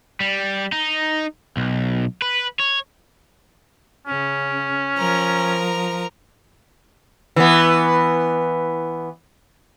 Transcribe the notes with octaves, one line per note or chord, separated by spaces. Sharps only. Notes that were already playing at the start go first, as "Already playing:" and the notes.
G3
D#4
B1
B4
C#5
C#3 C#4
F3 A#4 A#5
E3 B3